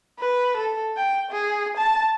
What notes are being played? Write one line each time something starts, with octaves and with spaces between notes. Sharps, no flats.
B4
A4
G5
G#4
A5